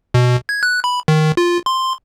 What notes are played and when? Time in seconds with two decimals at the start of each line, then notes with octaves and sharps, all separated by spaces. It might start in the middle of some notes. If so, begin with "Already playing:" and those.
0.14 B2
0.49 G#6
0.63 F#6
0.84 B5
1.08 D#3
1.37 F4
1.66 C6